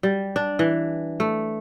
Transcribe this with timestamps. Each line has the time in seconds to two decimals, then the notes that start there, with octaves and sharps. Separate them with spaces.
0.03 G3
0.36 D4
0.59 E3
1.20 A3